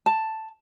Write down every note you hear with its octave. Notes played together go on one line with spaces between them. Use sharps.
A5